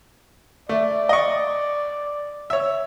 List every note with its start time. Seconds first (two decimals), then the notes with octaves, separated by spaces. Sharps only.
0.69 A3 D5
1.09 D#5 C#6
2.50 C#5 E5